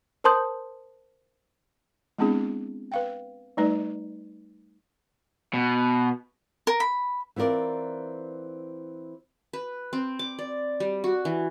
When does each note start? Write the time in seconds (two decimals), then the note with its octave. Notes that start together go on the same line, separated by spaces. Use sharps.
0.24 A#4 C5 A5 C6 D#6 G6
2.19 G#3 B3 C4 D4 E4 G#4
2.92 B4 F5 G5
3.57 G3 A3 D#4 B4 D5
5.54 B2
6.67 A#4
6.80 B5
7.36 E3 C4 F4 A#4 D5
9.53 B4
9.93 C4
10.19 D6
10.39 D5
10.80 G3
11.04 F#4
11.25 E3